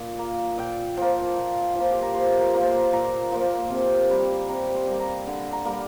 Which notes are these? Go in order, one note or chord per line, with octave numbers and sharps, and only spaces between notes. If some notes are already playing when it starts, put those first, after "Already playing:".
Already playing: A#2
A#3
A#2 G5
F3 A#3
A#2
F3 A#3 F4
G4
A#4
A#2 C5
A#4
F3 A#3
C5
A#2 A#5
F3 A#3
C3
G3 A#3
C3 A#5
C6
G3 A#3
A#5
D3
A#5
G3 A#3